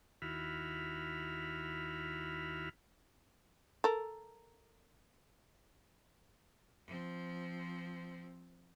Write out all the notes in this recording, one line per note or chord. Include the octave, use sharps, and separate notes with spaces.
D#2 E4 F#4 B5 F6
A4 A#4
F3 C4